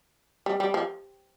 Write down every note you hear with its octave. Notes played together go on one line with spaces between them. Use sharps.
G3
G3
F3